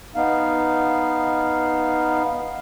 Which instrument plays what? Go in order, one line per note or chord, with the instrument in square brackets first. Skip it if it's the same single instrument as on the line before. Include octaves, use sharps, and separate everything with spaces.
[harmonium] B3 D#4 F5